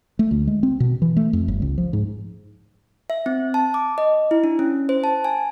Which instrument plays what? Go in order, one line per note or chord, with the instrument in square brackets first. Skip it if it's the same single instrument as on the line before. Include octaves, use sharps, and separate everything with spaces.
[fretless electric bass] A3
D2
G#3
C4
B2
E3
A3
F2
G1
C#2
F3
G#2
[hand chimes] E5
C4
A5
D6
D#5
E4
D4
C#4
C5
A5
G#5